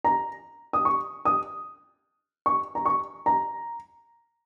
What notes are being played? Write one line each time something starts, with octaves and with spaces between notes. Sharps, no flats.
A#5
D#6
C#6
D#6
C#6
A#5
C#6
A#5